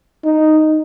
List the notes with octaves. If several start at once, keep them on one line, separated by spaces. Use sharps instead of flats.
D#4